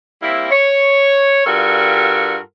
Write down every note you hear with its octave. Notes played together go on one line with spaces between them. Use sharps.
G3 A#3 C4 E4
C#5
G2 G3 F4 F#4 A4 A#4